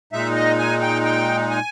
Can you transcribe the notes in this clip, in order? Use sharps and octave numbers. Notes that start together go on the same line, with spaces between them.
A#2 G#3 D#4 E5
D#5
G#5
G5
G5
G#5